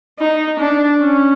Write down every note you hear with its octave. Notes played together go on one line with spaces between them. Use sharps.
D#4
D4
C#4